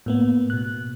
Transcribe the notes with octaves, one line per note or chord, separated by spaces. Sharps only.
A2 A#3 B3
B2 F#6